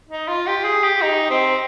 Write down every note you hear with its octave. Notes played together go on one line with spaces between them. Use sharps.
D#4
F4
G4
G#4
G4
D#4
C4